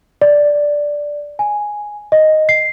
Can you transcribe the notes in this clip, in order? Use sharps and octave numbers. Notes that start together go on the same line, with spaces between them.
D5
G#5
D#5
C7